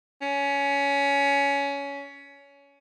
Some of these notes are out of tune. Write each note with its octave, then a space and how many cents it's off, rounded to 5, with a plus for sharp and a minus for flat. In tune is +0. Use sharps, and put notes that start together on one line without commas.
C#4 +20